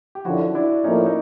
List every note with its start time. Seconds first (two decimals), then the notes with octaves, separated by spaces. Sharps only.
0.15 G4
0.25 F#2 D3 F3 E4 F#4
0.55 D4 E4
0.84 A2 F3 A#3 C#4 D#4
1.06 D#4